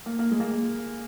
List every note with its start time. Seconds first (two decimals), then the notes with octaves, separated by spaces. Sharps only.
0.06 A#3
0.19 A#3
0.31 G#3
0.40 A#3